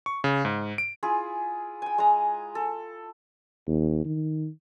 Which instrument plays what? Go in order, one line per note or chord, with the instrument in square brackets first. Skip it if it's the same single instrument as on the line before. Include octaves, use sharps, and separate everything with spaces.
[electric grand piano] C#6
C#3
G#2
D7
[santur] E4 F4 G#4
G5 G#5
G#3 A#5
A4
[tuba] D#2
D#3